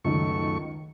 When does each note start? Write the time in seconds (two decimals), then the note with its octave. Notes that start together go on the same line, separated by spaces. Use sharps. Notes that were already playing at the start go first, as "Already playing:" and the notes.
0.04 C#2 F#2 D#3 A3 C#6